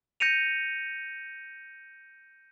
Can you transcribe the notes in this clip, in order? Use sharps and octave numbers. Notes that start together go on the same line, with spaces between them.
G6 A#6 C#7 D#7 F7